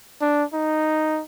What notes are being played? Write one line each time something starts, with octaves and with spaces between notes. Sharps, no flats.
D4
D#4